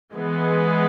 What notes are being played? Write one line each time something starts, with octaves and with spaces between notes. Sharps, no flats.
E3 G#3 B3